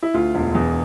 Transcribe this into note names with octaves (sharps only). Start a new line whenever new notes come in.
E4
D2 F4
E1
E2